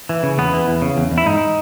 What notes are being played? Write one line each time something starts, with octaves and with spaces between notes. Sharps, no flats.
E3
C#3
E2 B3
E3
E2
C#3
E2
E2
E4
G#2 D#4